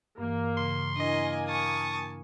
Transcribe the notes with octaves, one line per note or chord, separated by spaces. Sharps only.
G2 E3 A#3
C#3 C6
A#3 D4 E4 D#5 G#5
A5 C#6 D#6